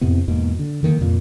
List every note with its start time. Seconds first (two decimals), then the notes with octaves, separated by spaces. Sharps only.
0.01 F2 A2 C3 B3
0.28 E2 G#2 B2 A#3
0.59 D3
0.83 D3 D#3 A3 A#3
0.99 C2 F2 A#2 A#3